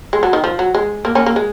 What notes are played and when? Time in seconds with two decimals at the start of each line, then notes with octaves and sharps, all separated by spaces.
0.13 G#3
0.23 F#3
0.33 D#3
0.44 F3
0.59 F#3
0.75 G#3
1.05 A#3
1.15 A#3 C#4
1.26 A#3
1.36 G#3